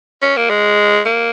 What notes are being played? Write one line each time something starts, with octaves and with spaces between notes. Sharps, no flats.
C#4
A#3
G#3
A#3